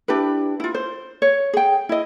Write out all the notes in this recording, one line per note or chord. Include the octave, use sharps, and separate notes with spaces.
D4 E4 G4 B4
E4 F4
C5
C#5
G#4 G5
E4 D#5